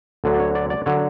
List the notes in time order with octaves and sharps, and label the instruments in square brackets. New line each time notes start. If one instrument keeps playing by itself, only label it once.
[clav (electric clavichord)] D2 D3 F#3
D5
C#5
D5
D5
D3 F#3 C#5